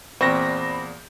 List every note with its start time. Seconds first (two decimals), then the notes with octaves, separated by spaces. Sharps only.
0.21 E2 A#2 C4 B5 C#6 A#6